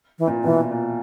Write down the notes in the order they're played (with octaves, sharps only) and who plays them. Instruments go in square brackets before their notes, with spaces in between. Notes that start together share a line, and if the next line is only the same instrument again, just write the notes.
[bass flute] E3
[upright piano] A#2
[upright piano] B2 [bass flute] E3
[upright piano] A#2